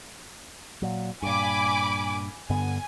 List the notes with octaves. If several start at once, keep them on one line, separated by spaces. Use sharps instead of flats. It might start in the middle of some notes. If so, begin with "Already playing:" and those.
A#2 F#3
G2 A#2 G#5 B5 D6
G2 D3 B3 G#5